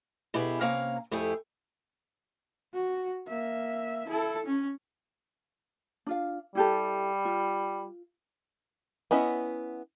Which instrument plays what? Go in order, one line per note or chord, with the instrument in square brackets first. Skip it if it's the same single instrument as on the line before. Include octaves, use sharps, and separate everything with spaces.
[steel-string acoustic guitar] B2 E4 G4 G#4
C3 A#3 C#4 F5 A#5
F2 A3 E4 G4 G#4
[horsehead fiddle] F#4
A#3 E5
E4 A4
C#4
[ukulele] D4 F4 F5
[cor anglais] G3 [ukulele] E4 G4 A4
[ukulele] F4
[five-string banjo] B3 C#4 E4 D#5 E5